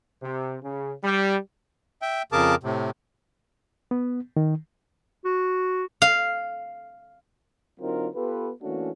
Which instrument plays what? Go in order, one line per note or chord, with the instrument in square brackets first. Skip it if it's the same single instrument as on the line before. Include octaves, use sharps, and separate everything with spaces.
[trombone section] C3
C#3
G3
[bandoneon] E5 G5
F2 C#3 G#4 A#4 A5 D6
A2 C3
[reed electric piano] B3
D#3
[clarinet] F#4
[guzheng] F5
[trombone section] D3 F#3 C4 D#4 F4 A#4
B3 F4 G4 A4 B4
E3 A3 A#3 C#4 D4 F#4